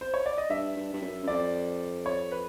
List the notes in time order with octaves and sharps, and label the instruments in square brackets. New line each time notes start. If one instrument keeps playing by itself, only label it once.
[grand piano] C5
C#5
D5
D#5
[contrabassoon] G2 [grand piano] E5
[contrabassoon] G2
G2
F#2
F#2
[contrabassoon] F2 [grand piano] D5
[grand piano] C#5
B4